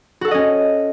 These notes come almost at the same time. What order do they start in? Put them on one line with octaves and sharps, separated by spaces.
F#4 A4 F#5 D#5 C#4